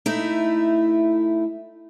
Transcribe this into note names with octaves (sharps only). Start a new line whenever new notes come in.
A3 D#4 E4